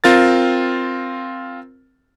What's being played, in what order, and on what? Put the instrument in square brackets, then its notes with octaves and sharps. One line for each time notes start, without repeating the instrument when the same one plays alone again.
[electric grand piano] C4 F4 A#4 A6